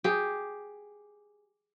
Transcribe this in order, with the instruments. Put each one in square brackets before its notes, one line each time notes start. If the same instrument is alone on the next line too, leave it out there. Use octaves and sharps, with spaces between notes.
[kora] G4 G#4